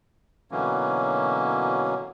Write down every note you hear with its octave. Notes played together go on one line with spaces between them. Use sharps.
B2 D3 E3 F#3 A#3 C#4